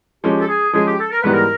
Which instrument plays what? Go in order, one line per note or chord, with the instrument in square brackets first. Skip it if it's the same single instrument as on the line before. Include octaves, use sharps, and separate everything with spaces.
[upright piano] F3 G#3 C#4 [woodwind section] G4
[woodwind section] A4
G#4
[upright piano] F3 G#3 C#4 [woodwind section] G#4
[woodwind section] G4
A4
A#4
[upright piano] G#2 E3 G3 B3 [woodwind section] B4
[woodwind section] A#4